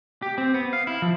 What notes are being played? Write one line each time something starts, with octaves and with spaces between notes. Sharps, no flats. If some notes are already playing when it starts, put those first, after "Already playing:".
G4
C4
B3
F5
E4
F3